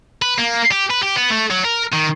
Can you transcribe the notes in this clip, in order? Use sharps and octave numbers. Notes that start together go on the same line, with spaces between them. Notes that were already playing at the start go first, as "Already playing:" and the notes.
B4
A#3
G4
B4
G4
B3
A3
F#3
A#4
D#3